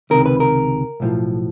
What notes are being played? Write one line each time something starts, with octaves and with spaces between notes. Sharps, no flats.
C#2 C3 D#3 A#4
B4
A#4
B1 A2 F3